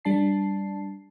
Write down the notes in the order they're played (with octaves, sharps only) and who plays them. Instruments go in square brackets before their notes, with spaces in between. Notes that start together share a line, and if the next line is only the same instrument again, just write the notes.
[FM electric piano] G3 D4 A5 C7